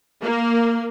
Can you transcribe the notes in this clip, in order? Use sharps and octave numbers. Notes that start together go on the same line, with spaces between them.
A#3